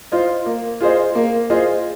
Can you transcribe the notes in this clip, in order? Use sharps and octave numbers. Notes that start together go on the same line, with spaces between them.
F4 C5 D#5
A#3
F4 G#4 C5 D#5
A#3
F4 G#4 C5 D#5